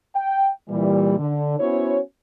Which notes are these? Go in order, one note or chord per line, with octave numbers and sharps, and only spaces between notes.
G5
A#2 E3 G3
D3
B3 C#4 E4 F#4 C5 C#5